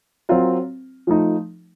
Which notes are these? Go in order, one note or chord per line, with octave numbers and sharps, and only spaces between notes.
F#3 C4 F4 A#4
F3 A3 D#4